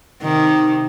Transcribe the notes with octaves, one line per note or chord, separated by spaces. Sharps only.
C3 D#3